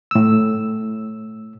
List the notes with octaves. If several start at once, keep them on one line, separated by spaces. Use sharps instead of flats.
A2 E6